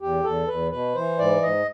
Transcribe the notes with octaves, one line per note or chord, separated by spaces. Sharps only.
E2 G4
E2 A4
E2 B4
B2 B4
E3 C5
G#2 D5
G#2 D#5